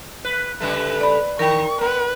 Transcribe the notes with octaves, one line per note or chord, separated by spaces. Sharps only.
B4
C#3 G3 A3 B4
D5 B5
D#3 D#4 A#4 G5 C#6
B3 B4